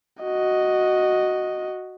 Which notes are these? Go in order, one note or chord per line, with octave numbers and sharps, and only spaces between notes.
F#4 D#5